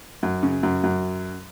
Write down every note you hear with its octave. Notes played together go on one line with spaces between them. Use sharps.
F#2
C#3
F#2
F#2